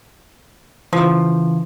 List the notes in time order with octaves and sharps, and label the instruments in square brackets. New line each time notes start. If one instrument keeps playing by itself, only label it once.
[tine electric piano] C#3 E3 [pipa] F3